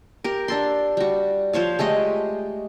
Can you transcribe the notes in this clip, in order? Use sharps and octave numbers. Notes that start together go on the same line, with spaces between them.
G4 A#4
D4 A4 C6
G3 F#4
F3 C5 C#5 F5
G#3 A3 G4 D#5